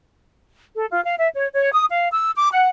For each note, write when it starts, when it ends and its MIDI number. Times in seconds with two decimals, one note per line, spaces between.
0.75 0.85 69
0.90 1.01 65
1.04 1.14 77
1.17 1.28 76
1.34 1.47 73
1.53 1.71 73
1.72 1.85 87
1.90 2.08 77
2.11 2.31 88
2.35 2.47 86
2.51 2.69 78